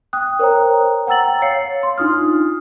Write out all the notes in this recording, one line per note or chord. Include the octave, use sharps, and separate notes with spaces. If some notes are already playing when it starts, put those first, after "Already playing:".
G5 D#6 F#6
A#4 C5 C#5 G5 A#5
F#5 G5 A#5 E6 A6 F#7
C#5 F5 A6 C7 C#7
C6
D4 D#4 F4 D#6 F6